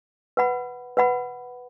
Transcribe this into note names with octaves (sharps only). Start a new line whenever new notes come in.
B4 F#5 B5
B4 F#5 B5